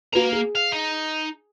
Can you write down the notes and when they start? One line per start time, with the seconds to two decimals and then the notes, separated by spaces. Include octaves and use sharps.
0.13 A#3 F#4 B4 A#5
0.32 G#4
0.55 F5
0.72 D#4